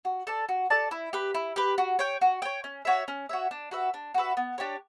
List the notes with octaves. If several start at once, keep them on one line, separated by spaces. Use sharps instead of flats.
F#4
A4 D5 A5
F#4
A4 D5 A5
E4
G4 B4
E4
G4 B4
F#4
C#5 G5
F#4
C#5 G5
C#4
F#4 C#5 E5
C#4
F#4 C#5 E5
D4
F#4 B4 E5
D4
F#4 B4 E5
B3
D4 G4 C#5